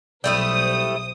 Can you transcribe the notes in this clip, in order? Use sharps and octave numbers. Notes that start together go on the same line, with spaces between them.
B1 G3 A3 E4 C5 D#6